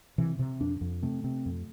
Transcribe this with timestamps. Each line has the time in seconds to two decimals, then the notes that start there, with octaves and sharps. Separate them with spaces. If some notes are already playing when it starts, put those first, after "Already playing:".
0.18 C3 E3
0.39 C3
0.61 F2 D4
0.81 F2
1.03 C3 A3
1.24 C3
1.46 F2